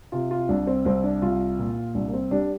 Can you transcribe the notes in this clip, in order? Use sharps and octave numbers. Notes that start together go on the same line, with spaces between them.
C3 F4
F4
C2 D4
C4
C2 C4
D4
C2 F4
A#2
C2 D4
A#3
C4
G3 D4